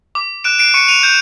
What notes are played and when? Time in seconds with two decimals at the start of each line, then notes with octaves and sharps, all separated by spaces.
0.15 D6
0.44 F#6 D7 E7
0.59 C7 D7
0.74 C#6 C#7 D#7
0.88 D#7 F7
1.03 G6